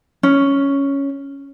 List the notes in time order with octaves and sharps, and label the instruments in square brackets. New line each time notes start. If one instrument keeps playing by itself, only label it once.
[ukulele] C#4